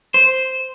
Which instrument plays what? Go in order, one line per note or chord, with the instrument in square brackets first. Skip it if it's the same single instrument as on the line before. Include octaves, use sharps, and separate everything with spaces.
[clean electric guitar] C5